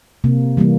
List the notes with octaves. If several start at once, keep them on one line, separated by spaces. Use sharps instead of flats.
C3 A#3
E3 G3 A#3